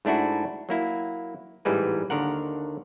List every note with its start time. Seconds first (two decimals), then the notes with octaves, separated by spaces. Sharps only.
0.05 G#2 A3 D4 E4 F#4
0.69 F#3 A#3 E4
1.65 A1 G#2 E3 G3 G#3 B4
2.10 D#2 D3 D#3 A#4 F#5